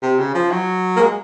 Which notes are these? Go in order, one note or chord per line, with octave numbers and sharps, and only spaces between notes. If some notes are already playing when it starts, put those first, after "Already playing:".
C3
C#3
F3
F#3
A#3
G#3